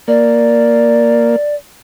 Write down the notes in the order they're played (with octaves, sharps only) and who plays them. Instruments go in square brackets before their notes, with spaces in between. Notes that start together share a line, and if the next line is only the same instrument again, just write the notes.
[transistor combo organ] A#3 [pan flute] D5